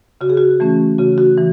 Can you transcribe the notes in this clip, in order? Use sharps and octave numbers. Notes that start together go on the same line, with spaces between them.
C#3 F#4
G#4
F#4
E3 A3 C#4
C#3 F#4
F#4
E3